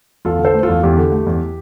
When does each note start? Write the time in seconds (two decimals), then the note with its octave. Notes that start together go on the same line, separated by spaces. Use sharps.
0.25 E2 F4 A4
0.39 D3
0.45 A4 C5
0.54 A3
0.63 F4 A4
0.69 E2
0.83 E2 G4
0.97 D3
1.12 A3
1.26 E2